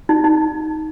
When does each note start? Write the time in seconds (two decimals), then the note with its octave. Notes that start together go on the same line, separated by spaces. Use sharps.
0.09 D#4
0.24 D#4